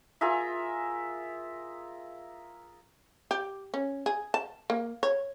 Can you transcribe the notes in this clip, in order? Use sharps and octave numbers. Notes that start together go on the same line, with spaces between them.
F4 G#4 A#4 E5
G4
C#4
G#4
A5
A#3
C#5